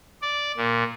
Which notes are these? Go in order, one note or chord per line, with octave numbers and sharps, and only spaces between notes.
D5
A#2